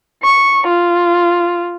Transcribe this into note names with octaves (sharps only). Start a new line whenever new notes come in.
C#6
F4